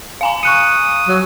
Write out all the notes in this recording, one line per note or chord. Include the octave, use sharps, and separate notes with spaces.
F5 G#5 A#5
C#6 D#6 F#6 C#7
F#3